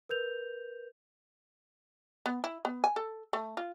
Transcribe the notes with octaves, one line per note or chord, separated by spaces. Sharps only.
A#4 B4 G6 F7
B3
E4
B3
G#5
A4
A3
F4